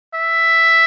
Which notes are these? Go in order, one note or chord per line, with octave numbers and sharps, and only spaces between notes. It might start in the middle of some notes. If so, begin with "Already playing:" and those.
E5